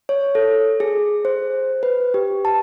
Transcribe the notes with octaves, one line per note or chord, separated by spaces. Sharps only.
C#5
A4
G#4
C5
B4
G4
A5